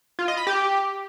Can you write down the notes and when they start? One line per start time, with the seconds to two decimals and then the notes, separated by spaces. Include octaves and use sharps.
0.19 F4
0.28 D#5
0.37 B5
0.47 G4